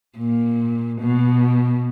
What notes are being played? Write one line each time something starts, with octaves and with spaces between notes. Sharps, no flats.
A#2
B2